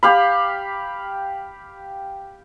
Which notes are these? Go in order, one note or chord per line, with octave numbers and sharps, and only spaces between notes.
G4 F5 B5